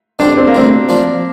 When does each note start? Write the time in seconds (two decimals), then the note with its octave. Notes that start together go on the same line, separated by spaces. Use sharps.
0.19 G2 D3 G3 C4 D4 G4
0.37 C4
0.47 A#3
0.54 D2 C3 G3 C4
0.89 A#2 F3 A#3 D4 F4